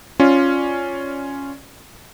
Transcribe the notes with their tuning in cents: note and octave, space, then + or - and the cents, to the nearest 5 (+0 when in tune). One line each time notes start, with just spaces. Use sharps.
C#4 +0 F4 +0 D5 +0